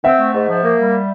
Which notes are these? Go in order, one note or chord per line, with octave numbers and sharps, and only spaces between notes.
C4 E5 F#5
A3
G#2
F3
A#3
G3